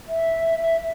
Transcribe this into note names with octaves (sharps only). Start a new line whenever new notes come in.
E5